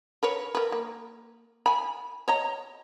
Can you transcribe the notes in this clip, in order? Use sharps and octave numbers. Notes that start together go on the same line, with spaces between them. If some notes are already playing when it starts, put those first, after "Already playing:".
A#4 B4 C#5
A#4 B4
A#3
G#5 B5
C#5 D#5 A#5